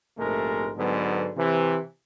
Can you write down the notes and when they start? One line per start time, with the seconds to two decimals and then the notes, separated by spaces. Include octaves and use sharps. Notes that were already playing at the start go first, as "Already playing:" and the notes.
0.18 A#1 G#2 C3 G#3 A3 A#4
0.77 G#2 D3 F#3 G#3 B3
1.37 C3 E3